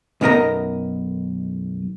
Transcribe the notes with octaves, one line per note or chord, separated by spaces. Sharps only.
B1 F#2 B3 A#4 D#5 A#5